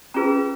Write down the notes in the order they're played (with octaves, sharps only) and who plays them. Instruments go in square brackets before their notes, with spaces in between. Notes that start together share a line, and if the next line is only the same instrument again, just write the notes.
[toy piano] C#4 F4 G#4 B4 A#5